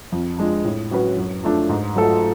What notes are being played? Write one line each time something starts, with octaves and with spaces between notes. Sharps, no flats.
F2
F3 G#3 D4
A2
F#3 C#4 F#4 B4
F#2
F3 A3 D4
G#2
F#3 A3 F4 A4